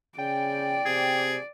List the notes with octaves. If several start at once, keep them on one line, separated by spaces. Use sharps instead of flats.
C#3 D5 G5
C3 G#4